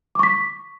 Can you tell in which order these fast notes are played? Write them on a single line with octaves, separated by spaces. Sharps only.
D6 C#6 B6